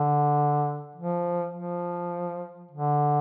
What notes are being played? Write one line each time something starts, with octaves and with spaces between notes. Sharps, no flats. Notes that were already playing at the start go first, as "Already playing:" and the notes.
Already playing: D3
F3
F3
D3